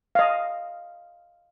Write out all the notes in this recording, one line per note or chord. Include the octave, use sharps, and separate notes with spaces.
D#5 F5